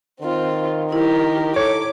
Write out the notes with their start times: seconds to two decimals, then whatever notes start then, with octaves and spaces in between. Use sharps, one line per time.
0.21 D#3 C4 F4
0.92 E4 G4 A#4
1.56 A4 C#5 D6